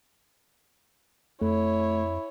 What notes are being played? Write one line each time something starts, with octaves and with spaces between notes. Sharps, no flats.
F2 A3 E4 C#5